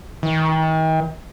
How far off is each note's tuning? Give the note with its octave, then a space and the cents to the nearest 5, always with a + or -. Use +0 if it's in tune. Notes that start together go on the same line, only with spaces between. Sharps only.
D#3 +40